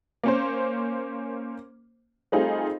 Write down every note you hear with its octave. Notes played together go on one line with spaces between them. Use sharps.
A#3 C#4 C5
G3 A3 C4 D#4 F4 G#4